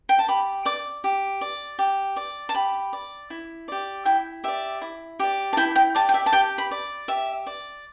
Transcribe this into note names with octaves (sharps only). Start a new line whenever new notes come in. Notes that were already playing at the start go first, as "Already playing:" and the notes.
G5
A5
G4 B5
D5 D6
G4
D5
G4
D5
A5
G4 B5
D5
E4
G4 D5
E4 G5
G4 D5 E5
E4
G4 D5
A5
E4 G5
G5
G4 D5 A5
G5
E5
A5
G4 G5
B5
D5
G4 E5
D5